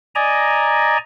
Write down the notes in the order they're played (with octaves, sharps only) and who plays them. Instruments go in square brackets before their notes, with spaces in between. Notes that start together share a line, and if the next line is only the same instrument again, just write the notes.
[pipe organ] D5 D#5 G#5 A#5